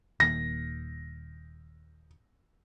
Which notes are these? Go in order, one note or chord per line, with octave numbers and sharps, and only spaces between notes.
D#1 D#3 A#3 A#6